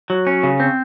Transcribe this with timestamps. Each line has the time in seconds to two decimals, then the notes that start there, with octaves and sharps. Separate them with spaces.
0.10 F#3
0.27 C#4
0.43 C#3
0.60 C4